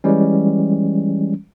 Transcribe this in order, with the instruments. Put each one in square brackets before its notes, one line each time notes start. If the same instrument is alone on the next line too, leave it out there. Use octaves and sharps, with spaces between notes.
[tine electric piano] E3 G3 G#3 C#4